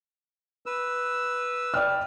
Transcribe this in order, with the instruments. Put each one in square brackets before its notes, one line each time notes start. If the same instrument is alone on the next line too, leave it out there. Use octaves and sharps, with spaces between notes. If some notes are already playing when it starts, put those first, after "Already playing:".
[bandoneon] B4 E6
[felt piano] D5 G5 F6